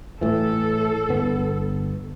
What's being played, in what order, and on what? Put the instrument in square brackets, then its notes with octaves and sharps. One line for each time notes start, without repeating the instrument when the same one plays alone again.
[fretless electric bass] A2 E3 [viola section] A4
[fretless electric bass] G1 B3